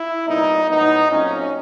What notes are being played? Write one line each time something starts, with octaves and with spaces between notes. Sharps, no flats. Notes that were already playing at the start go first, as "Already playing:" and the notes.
Already playing: E4
C2 A#2 G3 B3 D#4
A2 F#3 B3 D#4
A#2 F#3 A3 C4 C#4